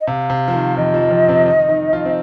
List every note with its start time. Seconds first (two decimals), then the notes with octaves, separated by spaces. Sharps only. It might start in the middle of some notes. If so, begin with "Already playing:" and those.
0.01 D#5
0.07 C3 F5
0.30 C3
0.48 F3
0.53 D#3
0.77 F2 F3 D#5
0.94 F2 F3
1.11 F2 F3
1.28 C3 C4
1.46 D#3 D#4
1.69 D#3 D#4
1.93 F3 F4
2.05 C4